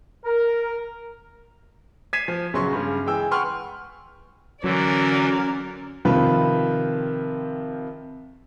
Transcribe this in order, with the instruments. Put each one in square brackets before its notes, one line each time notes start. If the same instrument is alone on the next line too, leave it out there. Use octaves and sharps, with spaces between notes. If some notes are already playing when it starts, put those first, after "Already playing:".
[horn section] A#4
[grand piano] G#6 B6 C7 D#7 E7
F3
A#1 C#3 F#3 B3 C6 C#6
G2 C#3
E3 G#3 G5 E6
B4 F#5 G5 C6 C#6 F6
[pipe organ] D3 E3 [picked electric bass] F#3 [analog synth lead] C#4 [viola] A#4 D5
[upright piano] C3 D#3 F3 F4 B4